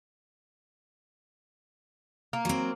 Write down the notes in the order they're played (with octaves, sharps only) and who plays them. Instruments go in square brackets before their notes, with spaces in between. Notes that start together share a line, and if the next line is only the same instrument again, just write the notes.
[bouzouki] A#3
[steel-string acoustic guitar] F#3 C4